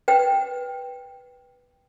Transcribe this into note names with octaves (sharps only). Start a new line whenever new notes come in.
B4 G5